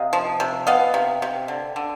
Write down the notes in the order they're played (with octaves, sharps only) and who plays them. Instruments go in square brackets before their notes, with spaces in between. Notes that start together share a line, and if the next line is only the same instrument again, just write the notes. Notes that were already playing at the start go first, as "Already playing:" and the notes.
Already playing: [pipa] C3 D#5 F5
F3
C3
B3 D#5 F5
C3
C3
D3
D3